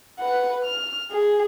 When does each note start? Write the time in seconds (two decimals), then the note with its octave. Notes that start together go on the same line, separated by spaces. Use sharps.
0.19 B4 F#5
0.65 F6
1.11 G#4